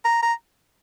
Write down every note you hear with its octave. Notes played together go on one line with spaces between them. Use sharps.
A#5
A#5